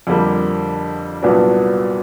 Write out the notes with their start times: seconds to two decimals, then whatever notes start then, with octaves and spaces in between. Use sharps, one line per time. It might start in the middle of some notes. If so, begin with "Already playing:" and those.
0.07 F2 D3 G3 A#3
1.23 C2 A#2 F#3 B3 D4